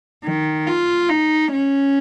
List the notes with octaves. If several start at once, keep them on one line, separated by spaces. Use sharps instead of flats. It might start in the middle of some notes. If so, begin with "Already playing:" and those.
D#3
F4
D#4
C#4